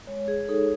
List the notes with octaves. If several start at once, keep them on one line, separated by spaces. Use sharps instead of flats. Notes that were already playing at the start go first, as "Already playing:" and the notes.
G#3 C#5
G#4
D#4 A4